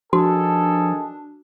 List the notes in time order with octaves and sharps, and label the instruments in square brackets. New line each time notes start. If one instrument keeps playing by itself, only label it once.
[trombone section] D#3 G#4 A4 [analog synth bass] F3 [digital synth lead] D4 [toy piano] F#4